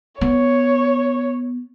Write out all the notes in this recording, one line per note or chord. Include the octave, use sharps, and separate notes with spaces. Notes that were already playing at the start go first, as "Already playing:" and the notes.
B3 C#5